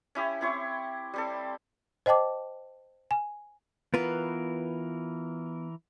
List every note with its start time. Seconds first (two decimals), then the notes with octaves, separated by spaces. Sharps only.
0.15 C#4 E4 G4
0.41 C4 E4 C#5
1.14 G3 C4 A4
2.06 C5 D#5 G5 A5 D6
3.11 G#5
3.94 E3 B3 F4 A#4 B4